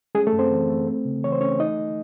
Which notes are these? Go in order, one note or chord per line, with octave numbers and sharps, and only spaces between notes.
G#3 C#4 G#4
A3 A4
F#2
C4 C5
E3
A3
C4
C#3
E3 C#5
C5
A3 C#4 C#5
D#4 D#5